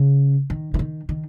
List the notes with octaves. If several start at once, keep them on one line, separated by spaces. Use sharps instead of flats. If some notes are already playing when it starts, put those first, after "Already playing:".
Already playing: C#3
D#3
E3
D#3
D#3